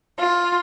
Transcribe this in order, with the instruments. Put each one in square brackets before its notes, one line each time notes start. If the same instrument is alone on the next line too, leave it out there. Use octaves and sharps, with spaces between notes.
[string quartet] F4